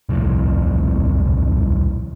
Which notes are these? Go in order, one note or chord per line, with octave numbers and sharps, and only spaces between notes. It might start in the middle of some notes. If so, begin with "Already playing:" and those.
D#1 C2 F2 A2